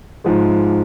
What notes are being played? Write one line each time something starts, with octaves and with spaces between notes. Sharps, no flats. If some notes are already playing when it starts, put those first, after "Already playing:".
G#2 F3 G#3